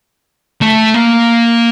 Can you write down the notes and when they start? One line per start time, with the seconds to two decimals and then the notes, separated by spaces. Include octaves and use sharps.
0.61 A3
0.94 A#3